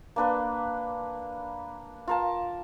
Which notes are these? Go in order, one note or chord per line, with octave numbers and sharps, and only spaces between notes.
A#3 D4 B4
F4 A#4 A5